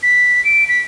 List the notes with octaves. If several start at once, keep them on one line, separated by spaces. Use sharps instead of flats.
B6
D7
B6